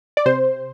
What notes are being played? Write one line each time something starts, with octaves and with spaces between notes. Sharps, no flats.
D5
C3 C5